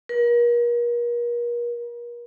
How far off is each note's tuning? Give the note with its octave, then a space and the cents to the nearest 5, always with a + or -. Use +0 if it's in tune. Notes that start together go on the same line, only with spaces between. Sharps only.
A#4 +40